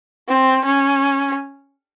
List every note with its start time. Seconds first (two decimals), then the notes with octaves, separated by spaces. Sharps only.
0.28 C4
0.65 C#4